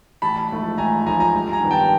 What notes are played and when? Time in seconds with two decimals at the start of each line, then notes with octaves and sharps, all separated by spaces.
0.22 A1 A5 B5
0.51 G#2 F3 A3
0.78 A1 G#5 A#5
1.06 G#2 F3 A3 G#5 A#5
1.20 G#5 A#5
1.34 G2
1.52 G#5 A#5
1.62 D#3 G3 B3
1.71 G5 A5